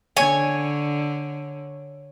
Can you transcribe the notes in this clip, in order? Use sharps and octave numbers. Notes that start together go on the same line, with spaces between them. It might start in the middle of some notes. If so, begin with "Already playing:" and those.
D3 C#5 G#5